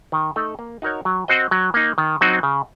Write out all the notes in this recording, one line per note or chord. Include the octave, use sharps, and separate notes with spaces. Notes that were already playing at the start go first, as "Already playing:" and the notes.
D#3
A3 D#4 A4
A#3
D#4 F#4 A#4 C#5
F#3
C4 F#4 C5 D#5
F#3
A#3 D#4
D#3
F#3 C4 D#4 F#4
C#3